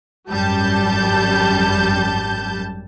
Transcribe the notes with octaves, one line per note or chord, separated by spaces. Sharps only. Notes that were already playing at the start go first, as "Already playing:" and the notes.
G#1 F#2 G3 A5 G6